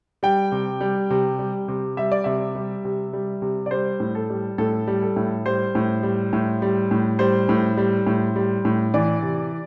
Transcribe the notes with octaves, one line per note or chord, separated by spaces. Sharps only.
G3 G5
C3
G3
C3
G3
C3
G3 E5
D5
C3 E5
G3
C3
G3
C3
D5
G3 C5
A2
A4
G3
A2 A4
G3
A4
A2
G3 C5
A2
G3
A2
G3
A2
G3 C5
A2
G3
A2
G3
A2
E3 D5
C3